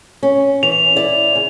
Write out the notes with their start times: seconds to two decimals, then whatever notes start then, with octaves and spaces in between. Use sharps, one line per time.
0.23 C#4
0.63 E3 F7
0.96 E4 D5
1.35 C#3